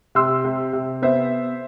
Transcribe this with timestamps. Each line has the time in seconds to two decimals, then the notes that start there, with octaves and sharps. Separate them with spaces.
0.15 C3 C6 E6
0.44 C3
0.73 C3
1.02 B3 C5 E5